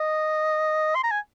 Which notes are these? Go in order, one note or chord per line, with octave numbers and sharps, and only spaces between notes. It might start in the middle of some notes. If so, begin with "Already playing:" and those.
Already playing: D#5
C6
A#5
G#5